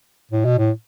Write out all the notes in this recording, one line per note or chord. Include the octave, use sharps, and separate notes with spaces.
A2
B2
A2